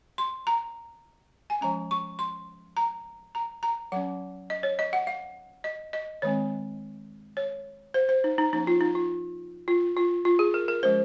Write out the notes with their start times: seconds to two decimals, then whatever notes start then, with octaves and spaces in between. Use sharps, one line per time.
0.18 C6
0.47 A#5
1.50 G#5
1.61 F3 G#3 C#4 A#5
1.91 C#6
2.19 C6
2.77 A#5
3.35 A#5
3.63 A#5
3.92 F#3 C#4 F#5
4.50 D#5
4.63 C#5
4.79 D#5
4.93 F#5
5.07 F5
5.64 D#5
5.93 D#5
6.22 D#3 G#3 C4 C#5
7.37 C#5
7.94 C5
8.09 C5
8.24 D#4
8.38 D#4
8.53 F3 A#3 C#4 D#4
8.67 F4
8.81 D#4
8.95 F4
9.68 F4
9.97 F4
10.25 F4
10.39 G#4
10.54 A#4
10.68 A#4
10.83 F3 G#3 C#4 C5